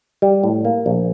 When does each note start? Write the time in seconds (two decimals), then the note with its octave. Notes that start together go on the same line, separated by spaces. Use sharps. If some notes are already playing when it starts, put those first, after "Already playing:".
0.22 G3
0.44 A2
0.65 A#3
0.86 A#1